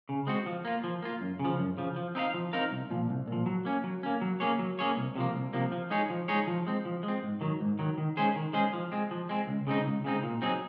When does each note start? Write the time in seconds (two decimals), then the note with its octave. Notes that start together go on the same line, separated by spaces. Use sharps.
0.09 C#3
0.27 G#3 C4 F#4
0.46 F3
0.65 A#3 F4
0.84 F3
1.02 A#3 F4
1.21 F#2
1.39 C#3
1.45 F3
1.59 F#2
1.78 C#3 F3
1.96 F3
2.15 C4 D#4 A#4 F5
2.34 F3
2.53 C4 D#4 A#4 F5
2.71 C2
2.90 A#2 F3
3.09 C2
3.28 A#2 F3
3.46 F#3
3.65 A#3 C#4
3.84 F#3
4.03 A#3 C#4
4.21 F#3
4.40 A#3 C#4 G#4 C#5
4.59 F#3
4.79 A#3 C#4 G#4 C#5
4.97 C2
5.16 C3 F3 A#3
5.35 C2
5.53 C3 F3 A#3
5.72 F3
5.90 G#3 D#4 G#4 C#5
6.10 F3
6.28 G#3 D#4 G#4 C#5
6.47 F3
6.67 G#3 C4
6.85 F3
7.03 G#3
7.08 C4
7.23 G#2
7.41 D#3 F#3
7.60 G#2
7.79 D#3 F#3
7.98 D#3
8.17 G#3 C#4 G#4 C5
8.36 D#3
8.53 G#3 C#4 G#4 C5
8.73 F3
8.92 G#3 C4
9.11 F3
9.29 G#3 C4
9.47 C#2
9.67 C#3 G#3 C4 D#4
9.86 C#2
10.04 C#3 G#3 C4 D#4
10.23 A#2
10.42 F#3 C4 D#4 G#4